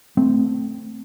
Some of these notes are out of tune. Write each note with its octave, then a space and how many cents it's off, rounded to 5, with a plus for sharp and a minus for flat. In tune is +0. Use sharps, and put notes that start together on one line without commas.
A3 +0 C4 -10